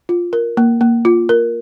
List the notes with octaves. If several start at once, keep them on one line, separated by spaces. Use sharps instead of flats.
F4
A#4
A#3
A#3
F4
A#4